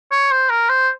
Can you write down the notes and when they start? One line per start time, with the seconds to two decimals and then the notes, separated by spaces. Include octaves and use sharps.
0.11 C#5
0.31 C5
0.50 A#4
0.69 C5